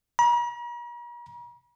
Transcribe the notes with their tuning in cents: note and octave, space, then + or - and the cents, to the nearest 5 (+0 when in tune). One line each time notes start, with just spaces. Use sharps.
A#5 +45